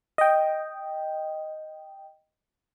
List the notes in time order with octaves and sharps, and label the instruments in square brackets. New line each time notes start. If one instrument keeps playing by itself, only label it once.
[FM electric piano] D#5 G5